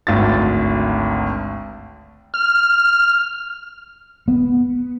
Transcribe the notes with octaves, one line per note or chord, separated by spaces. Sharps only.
G#1 D2 A6
F6
B3